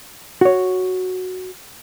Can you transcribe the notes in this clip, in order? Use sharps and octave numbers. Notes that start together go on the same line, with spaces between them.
F#4 C#5